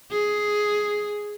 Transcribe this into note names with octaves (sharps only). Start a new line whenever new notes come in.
G#4